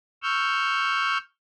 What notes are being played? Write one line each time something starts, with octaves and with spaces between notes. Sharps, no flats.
C#6 E6 F6 G6